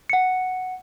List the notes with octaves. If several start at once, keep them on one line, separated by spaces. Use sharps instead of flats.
F#5 C#7